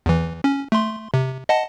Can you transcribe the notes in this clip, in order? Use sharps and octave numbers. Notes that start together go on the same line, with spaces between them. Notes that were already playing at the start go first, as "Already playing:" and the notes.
E2 E3
C#4
A3 C6
C3
D#5 F#5 A5